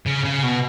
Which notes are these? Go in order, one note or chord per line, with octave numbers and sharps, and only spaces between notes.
C#3
C#3
B2